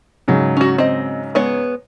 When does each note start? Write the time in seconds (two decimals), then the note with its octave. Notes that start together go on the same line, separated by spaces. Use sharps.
0.28 G#2 C#3 F#3
0.57 C#4 F#4
0.78 C4 D#5
1.35 G#3 B3 C#5